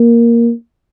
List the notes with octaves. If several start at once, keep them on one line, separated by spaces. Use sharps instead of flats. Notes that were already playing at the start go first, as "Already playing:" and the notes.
Already playing: A#3